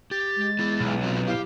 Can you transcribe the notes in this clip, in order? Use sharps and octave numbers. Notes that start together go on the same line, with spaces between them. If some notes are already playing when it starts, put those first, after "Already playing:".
G4 A6
G#3
B3 E4 G#4
B1
F#3 C4 F4
E4 G4 F5